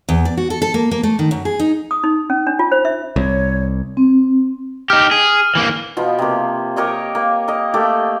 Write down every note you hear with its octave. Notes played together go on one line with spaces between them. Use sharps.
E2
D5
F#4
A4
A4
A#3
A#3
A3
D#3
F#2
G#4
D#4
D#6
D#4
C#4
D4
F4
C5
E5
C2 C#5
C4
D#4 G4 F6
G#4
E3 A#3
B2 F3 B3
C3 A#3
G4 A#4 C#5 D#5
A#3
A#4 D#5
A3 A#3 G4